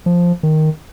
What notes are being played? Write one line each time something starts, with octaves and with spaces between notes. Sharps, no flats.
F3
D#3